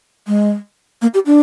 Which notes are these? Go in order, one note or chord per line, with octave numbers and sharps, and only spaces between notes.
G#3
A#3
G4
D4